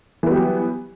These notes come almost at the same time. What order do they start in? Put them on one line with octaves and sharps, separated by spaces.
E3 B3 G3 G4 F#3